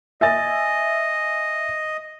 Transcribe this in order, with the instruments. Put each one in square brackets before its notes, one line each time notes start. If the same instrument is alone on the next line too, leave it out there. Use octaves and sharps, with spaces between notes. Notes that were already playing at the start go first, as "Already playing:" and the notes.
[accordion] D#5 [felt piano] E5 G#5 A6